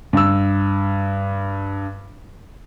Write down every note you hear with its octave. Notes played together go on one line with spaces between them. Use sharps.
G2 E6